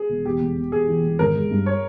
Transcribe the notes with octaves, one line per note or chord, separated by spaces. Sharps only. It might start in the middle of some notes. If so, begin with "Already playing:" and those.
Already playing: G#4
E1
E2 G4
E1
E1
E1 G#4
E3
E1
G#1 A#4
G#3
G2
C#5